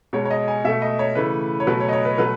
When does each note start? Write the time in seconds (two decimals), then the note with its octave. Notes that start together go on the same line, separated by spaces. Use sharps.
0.13 B2 G#3 C#5
0.25 C#5
0.31 D#5
0.48 G#5
0.64 B2 A3 E5
0.82 D#5
0.99 C#5
1.15 C#3 E3 A3 B4
1.60 C#5
1.67 B2 F#3 A3 B4
1.80 C#5
1.89 D#5
1.93 C#5
2.05 B4
2.18 B2 F#3 A3 B4